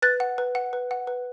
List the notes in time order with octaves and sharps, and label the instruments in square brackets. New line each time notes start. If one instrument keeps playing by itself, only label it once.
[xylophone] B4 F#6 A6
F#5
B4
F#5
B4
F#5
B4